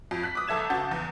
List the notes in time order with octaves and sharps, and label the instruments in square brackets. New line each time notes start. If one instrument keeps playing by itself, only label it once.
[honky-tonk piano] F2
F#6 B6
D6 D#6
G1 A4 E5 G#6 E7
C#3 F#4 A5 G6 A6
E2